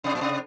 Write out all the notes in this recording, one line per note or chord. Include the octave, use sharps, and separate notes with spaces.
C3
A#2
C3